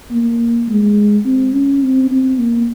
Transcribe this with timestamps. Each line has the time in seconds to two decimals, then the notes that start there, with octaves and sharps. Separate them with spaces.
0.12 A#3
0.69 G#3
1.26 C4
1.54 C#4
1.83 C4
2.11 C4
2.39 A#3